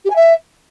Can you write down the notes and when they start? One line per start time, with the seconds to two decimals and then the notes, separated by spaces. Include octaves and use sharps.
0.05 G4
0.10 G#5
0.16 E5